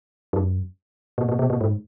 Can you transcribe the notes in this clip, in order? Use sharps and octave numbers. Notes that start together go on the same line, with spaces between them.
F#2
A#2
A#2
B2
A#2
G#2